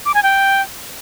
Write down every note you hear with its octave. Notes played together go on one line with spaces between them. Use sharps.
D6
G#5
G5